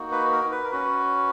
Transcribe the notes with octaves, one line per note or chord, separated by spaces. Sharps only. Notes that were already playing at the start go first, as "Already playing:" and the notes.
Already playing: A#3 D#4 F#4
B4
A#4
B4
A#4
C#4 F#4 B4